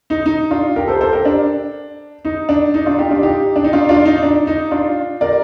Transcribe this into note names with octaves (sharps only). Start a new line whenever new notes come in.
D#4
D#4
D4 F4
G4 A#4
A4 C5
A4 C5
G4 A#4
D4
D#4
D4
D#4
D4 F4
D#4 G4
D4 F4
D#4 G4
D4
D#4
D4 F4
D4 F4
D#4
D4
D#4
D4 F4
A#4 D5